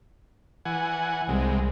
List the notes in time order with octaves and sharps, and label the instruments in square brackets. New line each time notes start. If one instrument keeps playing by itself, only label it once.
[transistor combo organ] E3 F#5 G#5
[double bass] C2 G3 [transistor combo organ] C3 G#3